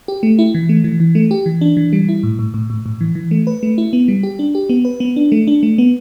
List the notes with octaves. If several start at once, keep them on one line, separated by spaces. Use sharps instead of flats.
G4
A3
E4
E3
A3
E3
E3
A3
G4
E3
D4
E3
G3
E4
A2
A2
A2
A2
A2
E3
E3
A3
B4
A3
E4
B3
G3
G4
D4
G4
B3
B4
B3
D4
A3
D4
A3
B3